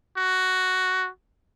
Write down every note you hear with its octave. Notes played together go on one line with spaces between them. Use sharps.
F#4